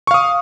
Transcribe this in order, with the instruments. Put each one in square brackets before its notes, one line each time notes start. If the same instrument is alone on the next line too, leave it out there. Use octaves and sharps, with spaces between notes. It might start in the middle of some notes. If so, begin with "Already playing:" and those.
[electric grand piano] C#6
F5
D#6